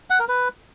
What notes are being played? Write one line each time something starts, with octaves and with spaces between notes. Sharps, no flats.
F#5
A#4
B4